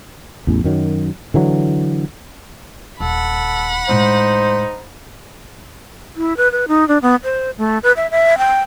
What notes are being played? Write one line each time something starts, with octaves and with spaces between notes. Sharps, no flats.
A1 E2
F#2 D#3 F#3
D3 E3 F#3
D#1 A4 F#5 B5
A2 G#3 D#4 C5
E4
B4
B4
D#4
D4
B3
C5
A3
B4
E5
E5
G5